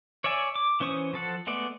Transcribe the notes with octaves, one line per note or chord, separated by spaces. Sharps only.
C#5 D5 E5 G#5
D6
E3 C#4 C5 C#6 D#6
F3 A4 F#5
G#3 A3 B3 D5